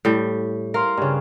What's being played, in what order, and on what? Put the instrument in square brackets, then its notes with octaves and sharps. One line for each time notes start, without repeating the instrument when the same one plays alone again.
[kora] A2 G3
[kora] A#4 [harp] F5 C6
[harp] G2 C#3